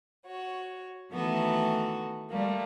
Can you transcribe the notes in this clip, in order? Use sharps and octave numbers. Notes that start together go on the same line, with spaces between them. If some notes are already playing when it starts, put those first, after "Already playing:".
F#4 C#5
D#3 E3 A3 B3 F#4 A4
G3 A3 A#3